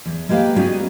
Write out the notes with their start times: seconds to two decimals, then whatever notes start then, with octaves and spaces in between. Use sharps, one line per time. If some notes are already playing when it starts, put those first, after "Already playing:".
0.06 E2
0.29 G#3 A#3 G4 B4 F5
0.56 G3 B3 C#4 D#4 F#4 G#4